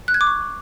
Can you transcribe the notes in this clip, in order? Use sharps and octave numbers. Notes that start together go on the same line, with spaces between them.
F#6
G#6
D6
C#6